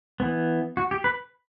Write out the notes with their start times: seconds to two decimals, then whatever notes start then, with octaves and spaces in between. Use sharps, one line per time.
0.20 E3 B3
0.77 F#4
0.91 G4
1.04 B4